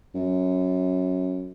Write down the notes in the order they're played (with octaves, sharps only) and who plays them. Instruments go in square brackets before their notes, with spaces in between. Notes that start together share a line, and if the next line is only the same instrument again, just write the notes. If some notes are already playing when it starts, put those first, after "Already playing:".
[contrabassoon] F#2